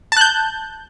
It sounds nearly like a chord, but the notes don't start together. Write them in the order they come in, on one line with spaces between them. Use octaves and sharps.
A5 F#6 G6